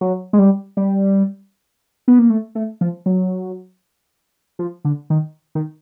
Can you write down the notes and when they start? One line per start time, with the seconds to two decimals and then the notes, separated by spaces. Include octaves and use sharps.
0.01 F#3
0.33 G#3
0.39 G3
0.77 G3
2.08 B3
2.19 A#3
2.30 A3
2.55 A3
2.81 F3
3.06 F#3
4.59 F3
4.85 D3
5.10 D#3
5.55 D#3